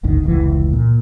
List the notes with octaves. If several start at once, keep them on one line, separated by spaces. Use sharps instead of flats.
D#1 G#1 D2 D#3
F1 C#2 E3
A#2